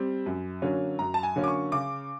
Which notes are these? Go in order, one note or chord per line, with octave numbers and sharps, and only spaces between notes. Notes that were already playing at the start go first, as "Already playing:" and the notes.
Already playing: G3 C4
F#2
D3 F#3 A#3 C#4
F#2 A#5
A5
G#5
D3 F#3 A#3 C#4
D6
C#6
C#3 D6